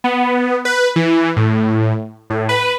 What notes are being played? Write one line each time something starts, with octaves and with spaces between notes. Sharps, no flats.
B3
B4
E3
A2
A2
B4